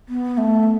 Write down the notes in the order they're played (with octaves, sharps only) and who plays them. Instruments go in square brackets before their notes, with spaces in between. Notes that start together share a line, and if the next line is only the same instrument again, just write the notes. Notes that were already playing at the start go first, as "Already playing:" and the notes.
[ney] B3
A3